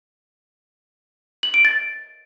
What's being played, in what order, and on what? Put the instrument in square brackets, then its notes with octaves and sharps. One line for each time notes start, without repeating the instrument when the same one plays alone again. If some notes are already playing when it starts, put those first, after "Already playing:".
[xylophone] F#7
D7
A6